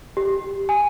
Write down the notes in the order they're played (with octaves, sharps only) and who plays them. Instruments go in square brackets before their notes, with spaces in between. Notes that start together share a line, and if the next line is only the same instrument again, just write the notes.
[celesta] G4
G#5